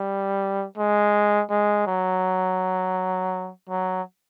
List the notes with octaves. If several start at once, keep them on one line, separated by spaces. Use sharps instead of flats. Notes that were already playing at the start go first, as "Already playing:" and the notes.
Already playing: G3
G#3
G#3
F#3
F#3